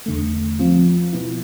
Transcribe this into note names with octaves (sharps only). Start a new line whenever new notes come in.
E2 D3 A3
F3 C4 F4
B2 B3 E4